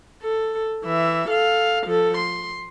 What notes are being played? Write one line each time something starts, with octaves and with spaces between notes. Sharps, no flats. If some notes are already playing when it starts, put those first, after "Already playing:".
A4
E3 E5
A4 F5
F3 A4
C6